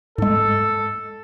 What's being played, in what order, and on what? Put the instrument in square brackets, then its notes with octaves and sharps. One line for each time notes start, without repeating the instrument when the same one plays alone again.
[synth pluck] G#2 G#3 [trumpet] A4